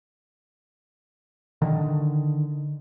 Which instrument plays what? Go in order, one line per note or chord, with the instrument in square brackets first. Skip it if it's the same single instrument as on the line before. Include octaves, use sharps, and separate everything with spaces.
[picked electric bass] D3 D#3